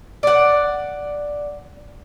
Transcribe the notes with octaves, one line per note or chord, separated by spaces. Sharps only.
D5 F#5